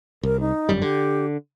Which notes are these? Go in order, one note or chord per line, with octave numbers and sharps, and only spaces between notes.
C2 A#4
D#4
G1 F#2 G3
D3 G4